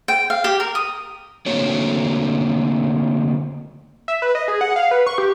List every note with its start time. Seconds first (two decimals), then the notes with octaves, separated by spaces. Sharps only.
0.08 G5
0.30 F5
0.44 G4
0.60 A#4
0.75 D#6
1.46 D3 A3 A#3 C4 F#4 C#5
4.08 E5
4.22 B4
4.35 D#5
4.48 G#4
4.61 F#5
4.76 F5
4.91 B4
5.06 C#6
5.18 G4